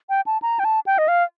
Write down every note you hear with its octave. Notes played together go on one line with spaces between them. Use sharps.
G5
A5
A#5
G5
A5
G5
D#5
F5